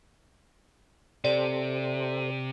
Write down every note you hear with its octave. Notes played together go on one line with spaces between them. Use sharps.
C3 G4 A4 C5 D5